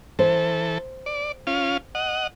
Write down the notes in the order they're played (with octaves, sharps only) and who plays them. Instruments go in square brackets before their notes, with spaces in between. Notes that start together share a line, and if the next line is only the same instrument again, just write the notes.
[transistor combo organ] E3 A4 [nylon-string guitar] C5
[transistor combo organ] D5
C#4 F4 F5
D#5 F#5